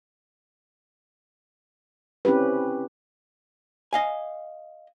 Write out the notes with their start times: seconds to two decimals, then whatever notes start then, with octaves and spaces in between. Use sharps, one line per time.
2.25 C4 C#4 E4 G4 B4
3.93 D#5 F5 G#5